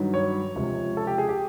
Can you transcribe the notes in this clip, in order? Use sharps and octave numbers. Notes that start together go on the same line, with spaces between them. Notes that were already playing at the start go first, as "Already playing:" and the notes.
Already playing: G2 D#3 F#3
C#5
C#2 C3 F3
A4
G4
G#4
G4